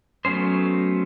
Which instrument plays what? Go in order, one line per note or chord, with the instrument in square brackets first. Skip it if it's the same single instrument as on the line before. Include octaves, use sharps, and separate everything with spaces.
[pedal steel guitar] F#3 A3 B3 C#4 C5